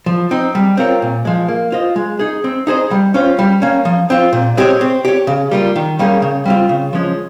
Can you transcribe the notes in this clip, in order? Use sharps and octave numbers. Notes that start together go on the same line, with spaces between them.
F3
C4 D#4
G3
C4 F4 A#4 C#5
A#2
F3 G#3
A#3
F4 C5 D#5
G#3
D#4 G#4
C4
D#4 G#4 C5 D#5
G3
C#4 F4 C5
G3
A#3 C#4
F3
C4 F4
A#2
G#3 C4 G4 C#5
C4
G4 C#5
C#3
G3 A#3 F4
D#3
G3 A#3 C#4 G#4
C#3
G3 C4 F4
C#3
F3 G#3 C#4